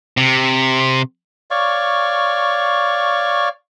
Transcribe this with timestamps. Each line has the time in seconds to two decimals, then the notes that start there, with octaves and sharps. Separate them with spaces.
0.17 C3
1.51 C#5 D5 F5 C#6